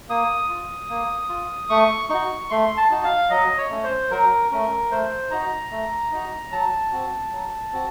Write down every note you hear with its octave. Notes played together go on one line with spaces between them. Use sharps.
A#3 D#6
F4
A#3
F4
A3 C#6
D#4 F#4 C#6
A3 C6
A5
D#4 F#4
F5
F#3 D#5
C#5
A3 C#4
C5
F#3 A#4
A3 C#4 A#4
A3 C5
D#4 F#4 A#5
A3
D#4 F#4
F#3 A5
C4 F#4
F#3
C4 F#4